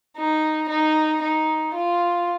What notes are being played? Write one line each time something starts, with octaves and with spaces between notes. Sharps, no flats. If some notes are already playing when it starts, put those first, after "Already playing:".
D#4
D#4
D#4
F4